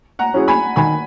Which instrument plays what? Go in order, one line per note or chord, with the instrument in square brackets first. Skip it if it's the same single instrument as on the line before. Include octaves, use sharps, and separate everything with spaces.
[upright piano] F#5 A#5
[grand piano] F#3 C#4 E4 G#4
[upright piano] G#5 B5
[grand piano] D#3 [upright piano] G#5 B5